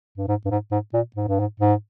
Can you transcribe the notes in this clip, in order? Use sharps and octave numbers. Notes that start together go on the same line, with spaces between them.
G2
G#2
G2
G#2
G#2
A#2
G#2
G2
G#2
G#2